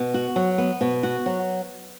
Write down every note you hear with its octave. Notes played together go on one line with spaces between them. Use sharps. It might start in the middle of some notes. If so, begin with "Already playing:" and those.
Already playing: B2
F#4
F#3
B3
B2
F#4
F#3